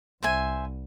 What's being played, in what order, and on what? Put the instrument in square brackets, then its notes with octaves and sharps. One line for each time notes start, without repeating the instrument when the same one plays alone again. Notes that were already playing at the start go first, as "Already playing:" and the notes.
[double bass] C2 [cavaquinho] C5 E5 G#5